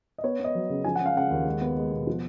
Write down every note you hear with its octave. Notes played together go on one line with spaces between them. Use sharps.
D#5
B3 C#5
B3 D#5
F#3
C#3
F3 G#5
C#3 F#5
F5
C#3 F#5
D#2
G#3
B3
G#3
B2
F3